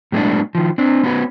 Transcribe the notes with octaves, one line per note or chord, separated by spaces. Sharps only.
A2 F#3 G#3 A#3 B3 D4
D#3 F3
C4 D4
B3 C#4 F#4 G#4 B4 C#5